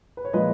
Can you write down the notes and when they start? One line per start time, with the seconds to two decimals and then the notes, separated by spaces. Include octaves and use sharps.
0.17 B4
0.25 C#5
0.33 A#2 F3 G#3 B4 D#5